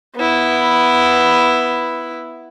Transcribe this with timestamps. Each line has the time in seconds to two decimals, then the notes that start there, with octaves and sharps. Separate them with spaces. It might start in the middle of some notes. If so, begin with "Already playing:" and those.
0.16 B3 E4